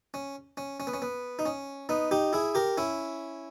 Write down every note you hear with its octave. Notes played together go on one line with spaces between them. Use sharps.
C#4
C#4
C#4
B3
C#4
B3
D#4
C#4
B3 D#4
D#4 G4
E4 G#4
G4 A#4
C#4 E4